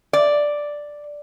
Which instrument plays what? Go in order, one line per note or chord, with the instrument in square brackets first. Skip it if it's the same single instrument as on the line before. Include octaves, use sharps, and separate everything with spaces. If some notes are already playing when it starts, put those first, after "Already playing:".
[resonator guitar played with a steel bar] D5